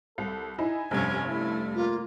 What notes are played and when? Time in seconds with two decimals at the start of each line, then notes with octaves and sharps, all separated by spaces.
0.18 C2 A4
0.58 D#4 E4 G#5
0.91 F1 G2 C3 F3 C#4 G#6
1.26 A3 E4
1.75 A#3 F4